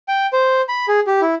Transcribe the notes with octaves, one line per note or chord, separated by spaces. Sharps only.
G5
C5
B5
G#4
G4
E4